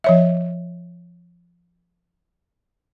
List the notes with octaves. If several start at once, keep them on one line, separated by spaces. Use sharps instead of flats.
F3 C#5 E5